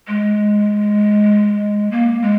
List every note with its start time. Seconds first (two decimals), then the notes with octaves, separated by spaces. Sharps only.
0.08 G#3
1.91 A#3
2.22 G#3